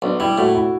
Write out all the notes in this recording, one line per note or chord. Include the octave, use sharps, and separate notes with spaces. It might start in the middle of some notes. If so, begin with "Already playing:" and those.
B1 D4
G3 E4
A2 F#4
E4